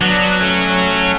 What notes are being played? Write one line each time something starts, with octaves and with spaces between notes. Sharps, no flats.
F#3 B3 D4
A3 C#4